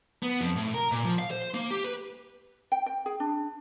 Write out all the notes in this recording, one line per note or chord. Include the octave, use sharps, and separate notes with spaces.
B3
F2
A2
A#4
A#2
F3
F5
C5
A#3
G4
B4
G5
G5
G#4
D4